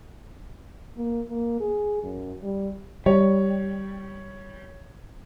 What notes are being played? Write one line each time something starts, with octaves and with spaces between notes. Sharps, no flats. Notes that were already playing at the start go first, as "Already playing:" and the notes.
A#3
A#3
G#4
F#2
G3
G3 C#5